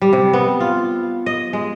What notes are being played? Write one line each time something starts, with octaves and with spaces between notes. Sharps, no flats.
G3
C3
B3
F4
D#5
G#3